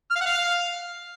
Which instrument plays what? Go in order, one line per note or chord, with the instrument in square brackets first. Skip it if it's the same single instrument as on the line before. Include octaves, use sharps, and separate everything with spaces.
[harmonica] F6
F5
F#5
F5